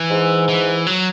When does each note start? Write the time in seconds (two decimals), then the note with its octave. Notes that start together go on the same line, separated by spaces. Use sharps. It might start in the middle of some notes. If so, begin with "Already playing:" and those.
Already playing: E3
0.10 G#2
0.49 E3
0.87 F#3